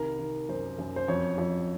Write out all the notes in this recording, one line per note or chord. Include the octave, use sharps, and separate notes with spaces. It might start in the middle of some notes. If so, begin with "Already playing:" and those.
Already playing: C2 D#3 A#4
D#3
F#2 C5
F#2
C5
F2 C#5
F2